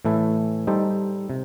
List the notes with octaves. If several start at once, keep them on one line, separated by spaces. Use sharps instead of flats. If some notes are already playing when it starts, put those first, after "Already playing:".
A2 E3 A3 E4 A4
G3 D#4 A4 C5
C3